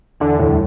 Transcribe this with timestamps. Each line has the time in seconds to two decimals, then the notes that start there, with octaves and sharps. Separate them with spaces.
0.20 E2 D3 E3
0.39 D2 A2 D3
0.49 G3